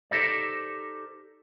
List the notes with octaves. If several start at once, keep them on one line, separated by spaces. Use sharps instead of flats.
D#4 G4 A4 A#4 C5 D5